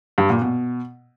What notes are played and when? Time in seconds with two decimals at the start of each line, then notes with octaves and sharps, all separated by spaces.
0.18 G2
0.30 A#2
0.42 B2